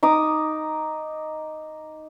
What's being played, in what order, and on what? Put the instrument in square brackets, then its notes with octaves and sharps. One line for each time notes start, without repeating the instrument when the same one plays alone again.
[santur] D#4 D6 D#6